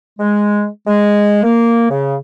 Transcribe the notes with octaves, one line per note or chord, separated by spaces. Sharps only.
G#3
G#3
A#3
C#3